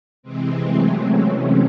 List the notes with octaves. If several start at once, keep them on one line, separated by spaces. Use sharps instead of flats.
C3 E3 G#3 C4
F#3 A3
A3 C#4